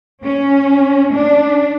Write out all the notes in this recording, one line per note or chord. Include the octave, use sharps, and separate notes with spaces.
C#4
D4